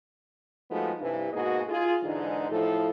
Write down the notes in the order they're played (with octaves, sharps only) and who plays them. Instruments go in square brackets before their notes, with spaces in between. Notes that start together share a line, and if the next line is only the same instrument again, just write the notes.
[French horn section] F3 G#3 A3 B3 D#4 F#4
G2 C3 E3
G#2 B2 A#3 F#4 G#4 D#5
F4 G#4
G#2 D3 E3 G#3 D4 D#4
A2 F3 A4